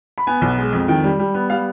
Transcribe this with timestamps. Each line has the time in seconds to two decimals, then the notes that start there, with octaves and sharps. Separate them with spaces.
0.18 B5
0.27 B3 G#5
0.41 B1
0.58 G#3
0.72 F2
0.88 D#3 G5
1.04 G3
1.19 G3
1.34 B3
1.50 G3 F5